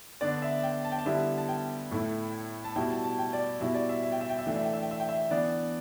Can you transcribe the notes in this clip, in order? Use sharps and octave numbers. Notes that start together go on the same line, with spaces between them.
D3 B3 D4 D5
E5
G5
A5
G5
A5
D3 G3 B3 E4 E5
A5
G5
A2 A3 E4
A5
B2 G3 E4 G5
A5
A5
G5
D5
B2 G3 E4 E5
D5
E5
E5
G5
E5
G5
E5
E3 A3 D4 G5
E5
G5
E5
G5
E5
G5
E5
E3 B3 D4 D5